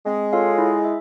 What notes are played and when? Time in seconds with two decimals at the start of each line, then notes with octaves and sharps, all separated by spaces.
0.06 G#3 C4
0.33 F4 A4 C#5 F5
0.58 E4
0.84 E5